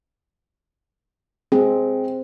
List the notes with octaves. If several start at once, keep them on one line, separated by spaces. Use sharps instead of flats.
G#3 C4